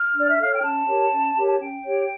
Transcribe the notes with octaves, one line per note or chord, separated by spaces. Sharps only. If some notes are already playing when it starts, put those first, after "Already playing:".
Already playing: F6
D4
D5
E5
A4 C#5 F5
G5
C#4 A5
G4 A#4 C#5
C#4
G4 A#4 C#5
A5
C#4 G5
G4 C#5